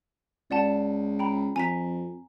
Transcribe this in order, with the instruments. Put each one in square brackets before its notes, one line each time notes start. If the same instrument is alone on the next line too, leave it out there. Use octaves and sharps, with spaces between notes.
[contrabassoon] C#2 [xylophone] D5 F#5 A5
[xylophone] G5 A#5 B5
[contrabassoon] F2 [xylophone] G#5 A#5 B6